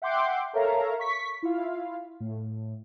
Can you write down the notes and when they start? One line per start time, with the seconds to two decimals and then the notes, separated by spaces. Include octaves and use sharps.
0.02 E5 F#5 G5 C6 D6 G6
0.53 A4 A#4 C#5 E5 F5 A#5
0.99 C#6 B6
1.42 E4 F4 F5
2.20 A2